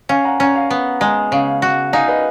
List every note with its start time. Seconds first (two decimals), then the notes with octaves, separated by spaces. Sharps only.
0.09 C#4 F5 G#5
0.24 F#5 A#5
0.40 C#4 F#5 A#5
0.55 F5 G#5
0.70 B3
1.01 G#3 F#5 A#5
1.31 C#3 F5 G#5
1.62 F#4
1.93 D#4 F5 G#5
2.08 B4 D#5